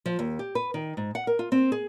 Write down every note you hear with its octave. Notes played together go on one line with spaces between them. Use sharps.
F3
D#2
G4
B4
D#3
G#2
F#5
A#4
F4
C4
G#4